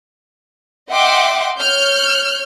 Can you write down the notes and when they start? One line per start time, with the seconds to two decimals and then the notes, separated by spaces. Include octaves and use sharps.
0.91 D#5 E5 F#5 G5 C6 D6
1.60 C#5 F6 G6